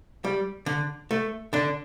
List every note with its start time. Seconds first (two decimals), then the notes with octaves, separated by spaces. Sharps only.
0.24 G3
0.66 D3
1.11 A3
1.53 D3 D4